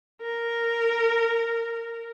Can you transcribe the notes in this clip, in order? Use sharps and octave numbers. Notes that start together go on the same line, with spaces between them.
A#4